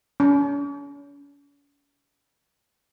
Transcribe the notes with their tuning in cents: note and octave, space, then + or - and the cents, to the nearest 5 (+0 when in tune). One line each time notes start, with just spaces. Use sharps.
C#4 +45